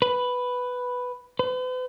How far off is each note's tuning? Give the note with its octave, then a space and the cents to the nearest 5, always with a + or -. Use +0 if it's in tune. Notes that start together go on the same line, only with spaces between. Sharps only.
B4 +5
B4 +45